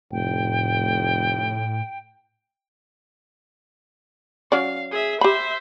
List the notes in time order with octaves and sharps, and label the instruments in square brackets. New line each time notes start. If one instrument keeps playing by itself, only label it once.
[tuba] F1 [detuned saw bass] A2 [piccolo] G5
[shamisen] F#3 C#4 D5 [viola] F5
[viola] G#4 E5
[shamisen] G4 B5 [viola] C5 E5